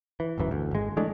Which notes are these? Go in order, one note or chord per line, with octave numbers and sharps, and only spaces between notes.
E3
D1 G#1 F#2 E3
D2
G#1 G#3
E3 G#3 A3 D4